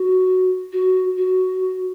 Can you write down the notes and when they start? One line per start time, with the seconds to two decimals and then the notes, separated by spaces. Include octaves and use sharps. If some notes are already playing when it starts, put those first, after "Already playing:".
Already playing: F#4
0.72 F#4
1.17 F#4